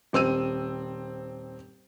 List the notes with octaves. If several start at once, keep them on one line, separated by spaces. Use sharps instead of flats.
D#1 C4 E6 D#7